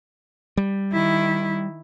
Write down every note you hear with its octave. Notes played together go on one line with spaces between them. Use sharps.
G3
D#3 E4